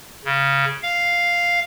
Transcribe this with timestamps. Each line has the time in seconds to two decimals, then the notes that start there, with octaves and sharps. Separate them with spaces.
0.25 C#3
0.83 F5